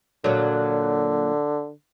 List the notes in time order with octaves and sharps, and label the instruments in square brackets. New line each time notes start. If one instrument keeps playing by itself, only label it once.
[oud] A#2 F#3 [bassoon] D3